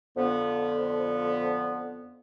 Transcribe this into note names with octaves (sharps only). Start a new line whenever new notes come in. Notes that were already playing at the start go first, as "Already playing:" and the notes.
F2 D3 F3 B3